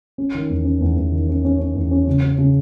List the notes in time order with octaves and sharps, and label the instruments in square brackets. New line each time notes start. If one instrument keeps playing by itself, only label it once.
[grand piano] C#4
D#3
E2
C#4
E2
E2
D#3
C#4
C#4
C#4
E2
C#4
C#3
C#4
C#3